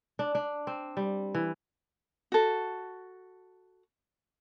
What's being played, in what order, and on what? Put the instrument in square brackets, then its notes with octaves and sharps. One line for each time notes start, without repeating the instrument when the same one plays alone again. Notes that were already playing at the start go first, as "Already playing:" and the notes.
[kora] D4
D4
C4
G3
E3
[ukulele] F#4 A4